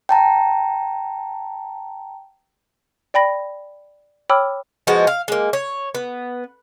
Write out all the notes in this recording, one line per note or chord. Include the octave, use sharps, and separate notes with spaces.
G5 A5 A#5
D5 G5 B5 A#6
C#5 G5 B5 D6 E6 F6
F3 G#3 B3 F#4
F5
G#3 A#3
C#5
B3